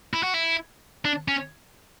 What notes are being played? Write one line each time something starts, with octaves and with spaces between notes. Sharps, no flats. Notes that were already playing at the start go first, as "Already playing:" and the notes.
E4
F#4
E4
D4
C#4